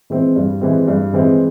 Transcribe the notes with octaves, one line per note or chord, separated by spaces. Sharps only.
E3 G#3 C4
G2
E3 G#3 C4
G2
E3 G#3 C4